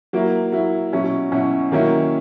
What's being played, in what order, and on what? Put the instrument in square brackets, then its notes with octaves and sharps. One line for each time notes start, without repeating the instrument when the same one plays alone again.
[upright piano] F#3 A#3 E4
F#3 A#3 E4
B2 F#3 C#4 E4
B2 F#3 C#4 E4
D#3 F#3 A#3 C#4 E4